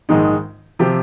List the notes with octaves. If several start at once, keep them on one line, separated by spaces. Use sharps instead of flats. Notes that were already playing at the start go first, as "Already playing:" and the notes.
A#1 G#2 D#3 G#3 D#4
C3 F3 C4 G4